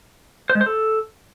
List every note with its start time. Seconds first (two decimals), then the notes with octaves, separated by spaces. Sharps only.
0.50 C5
0.55 G#3
0.61 C5
0.66 A4